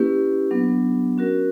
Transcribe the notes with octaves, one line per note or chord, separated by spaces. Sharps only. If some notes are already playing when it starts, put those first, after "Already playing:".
Already playing: A#3 C#4 E4 G4 B4
F#3 B3 D4
C#4 F#4 A#4